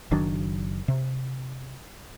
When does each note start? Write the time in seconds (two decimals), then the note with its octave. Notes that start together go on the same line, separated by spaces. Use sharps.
0.11 F#1 D#3 F#3 D4
0.88 C3